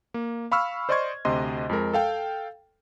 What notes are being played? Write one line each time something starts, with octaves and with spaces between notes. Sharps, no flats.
A#3
F5 B5 C#6 E6 F6
C5 D5 D#5 C6 C#6 G#6
D2 C3 D#5 C6
F2 G#3 A#4
A4 F5 G5